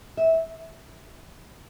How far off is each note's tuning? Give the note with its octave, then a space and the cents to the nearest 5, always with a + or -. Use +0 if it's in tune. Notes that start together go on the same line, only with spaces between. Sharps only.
E5 -20